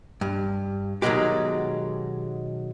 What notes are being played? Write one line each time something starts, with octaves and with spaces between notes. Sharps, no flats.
G2
B2 D#3 E3 F#3 G#3 G4